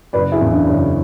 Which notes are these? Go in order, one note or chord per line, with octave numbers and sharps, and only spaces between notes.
F#1 B4 D5
E4 G#4
E2 C#3
D4
F#1 C#4